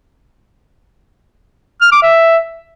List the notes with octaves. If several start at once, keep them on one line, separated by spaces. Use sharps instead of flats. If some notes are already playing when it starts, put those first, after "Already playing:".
F6
D6
E5